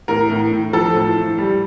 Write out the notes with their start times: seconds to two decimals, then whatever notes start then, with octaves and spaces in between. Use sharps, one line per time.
0.08 A2 A#4
0.30 A2
0.52 A2
0.73 F3 A4
0.95 A2
1.16 A2
1.38 G3